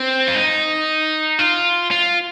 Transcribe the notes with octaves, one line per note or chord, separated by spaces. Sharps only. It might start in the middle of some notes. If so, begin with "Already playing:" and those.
Already playing: C4
F4
D#4
F4
F4